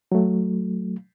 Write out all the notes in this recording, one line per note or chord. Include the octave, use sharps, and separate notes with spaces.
F#3 A3